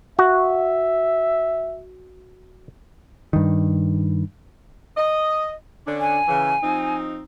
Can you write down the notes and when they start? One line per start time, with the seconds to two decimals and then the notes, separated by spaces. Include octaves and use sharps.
0.19 F#4 E5
3.33 G2 D#3
4.97 D#5
5.87 D3 C#4 D4
6.01 G#5
6.28 C#3 E3
6.63 F3 C4 D#4